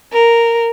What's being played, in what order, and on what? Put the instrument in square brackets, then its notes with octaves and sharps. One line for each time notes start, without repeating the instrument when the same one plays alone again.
[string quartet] A#4